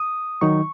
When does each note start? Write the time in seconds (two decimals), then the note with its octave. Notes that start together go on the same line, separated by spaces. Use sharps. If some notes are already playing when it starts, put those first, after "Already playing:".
Already playing: D#6
0.41 D#3 F#3 D#4 C#6